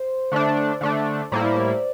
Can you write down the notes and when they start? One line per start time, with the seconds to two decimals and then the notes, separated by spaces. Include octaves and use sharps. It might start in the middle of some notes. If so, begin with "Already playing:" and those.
Already playing: C5
0.32 D3 A3 D4
0.81 D3 A3 D4
1.32 A2 G3 A#3 E4 C5
1.56 D5